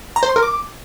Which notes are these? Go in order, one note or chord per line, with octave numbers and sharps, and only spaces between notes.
A#5
C5
C6
A#4
D6